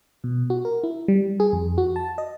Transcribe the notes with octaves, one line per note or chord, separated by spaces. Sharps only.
B2
F#4
A#4
E4
G3
G#4
F2
F#4
A5
D#5